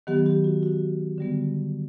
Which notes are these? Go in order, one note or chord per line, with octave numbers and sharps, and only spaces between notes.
D#3 F#3 B3 G4
G4
F#4
F#4
D3 G3 B3